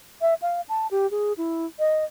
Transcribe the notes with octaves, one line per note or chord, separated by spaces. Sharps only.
E5
F5
A5
G4
G#4
E4
D#5